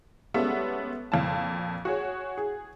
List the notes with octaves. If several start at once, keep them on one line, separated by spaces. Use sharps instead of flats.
G3 G#3 B3 C#4 A4 E5
F2 A#2 A5
F#4 G#4 C#5
G#4